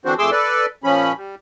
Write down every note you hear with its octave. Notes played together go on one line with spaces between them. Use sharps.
D3 E3 C4 D4 F#4 C5
F2 A3 G#4 C6 D6 E6
A4 B4 D5
A#2 F3 C#4 B5
G3